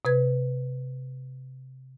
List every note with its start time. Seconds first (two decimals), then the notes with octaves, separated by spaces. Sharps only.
0.05 C3 B4 G#6